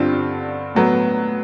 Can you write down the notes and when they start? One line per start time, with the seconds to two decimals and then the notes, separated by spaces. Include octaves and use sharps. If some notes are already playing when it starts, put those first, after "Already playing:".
Already playing: G2 D3 G3 C4 F4
0.75 A2 F#3 B3